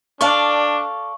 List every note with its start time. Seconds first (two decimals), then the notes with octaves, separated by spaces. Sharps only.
0.21 D4 A4 D5 F5 C#6